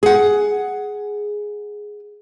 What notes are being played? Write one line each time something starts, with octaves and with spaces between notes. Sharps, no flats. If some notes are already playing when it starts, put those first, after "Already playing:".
G#4 F#5